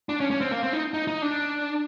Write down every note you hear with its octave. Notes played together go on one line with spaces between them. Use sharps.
D4
C#4
C#4
C4
A#3
C4
D#4
D#4
D#4
D4